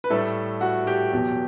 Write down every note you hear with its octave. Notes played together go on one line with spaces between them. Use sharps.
B4
A2 G3 A3 A4
F#4 F#5
G4 G5
E2 B2 F#3